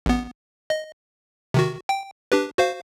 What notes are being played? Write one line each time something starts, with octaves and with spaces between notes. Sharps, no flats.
A1 B3
D#5
C3 D#3 F#4
G5
D4 G4 B4
F#4 C5 F5